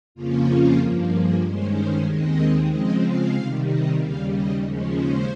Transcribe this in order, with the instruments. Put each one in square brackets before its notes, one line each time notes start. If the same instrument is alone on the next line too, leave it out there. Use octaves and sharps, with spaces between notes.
[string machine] F2 C#3 F3 A#3 C#4 F4
G2 F3 A#3
G#4
G2 D#3 G#3 C#4 C5
C5
D#2 D#3 G#3 C4 D#5
C#3 F3 G#3 C4 D#5
F5
C3 D#3 G3
D#5
D#2 C#3 G3 F5
D#5
D#2 C#3 F3 G#3 C#4
C5